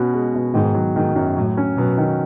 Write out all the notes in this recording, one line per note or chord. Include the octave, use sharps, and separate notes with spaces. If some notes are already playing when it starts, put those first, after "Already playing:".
Already playing: B2 C#4 F#4
G#3
B2
G#2 D#3
F#3
G#2 D#3
F#2
A2 F#3
C#4
B2 F#3
D#3